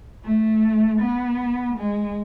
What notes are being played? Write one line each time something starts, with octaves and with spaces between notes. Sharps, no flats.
A3
B3
G#3